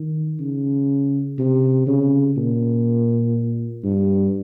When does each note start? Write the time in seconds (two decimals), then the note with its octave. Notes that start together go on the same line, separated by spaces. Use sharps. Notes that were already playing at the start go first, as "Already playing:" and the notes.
Already playing: D#3
0.40 C#3
1.39 C3
1.87 C#3
2.37 A#2
3.84 G2